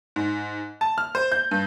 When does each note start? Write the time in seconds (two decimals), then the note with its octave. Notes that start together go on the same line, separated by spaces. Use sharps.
0.16 G#2
0.81 A5
0.98 F6
1.15 C5
1.32 G6
1.51 G2